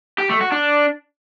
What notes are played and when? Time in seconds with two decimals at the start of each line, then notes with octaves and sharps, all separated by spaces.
0.18 G4
0.30 A3
0.41 F#4
0.52 D4